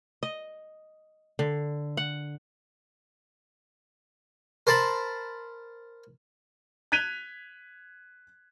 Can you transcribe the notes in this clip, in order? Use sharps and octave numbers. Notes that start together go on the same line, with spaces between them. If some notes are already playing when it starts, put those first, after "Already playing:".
D#5
D3
F#5
A#4 C5 A5 B5
F#6 G#6 B6 D#7 F7 G7